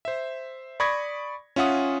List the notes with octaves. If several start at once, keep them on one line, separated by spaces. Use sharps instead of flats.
C5 E5
D5 B5 C#6 D#6 G#6 A#6
C#4 F4 E5 F#5 D#6